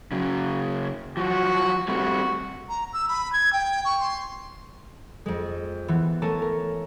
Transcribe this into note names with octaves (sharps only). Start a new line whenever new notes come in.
C#3 F#3
F3 F#3 F#4
G3 A3 C4 F#4
A#5
E6
B5
G#6
G5
C#6
C6
F2 G#3
E3 B3
A3 A#4 C#5 G#5 A5
A#4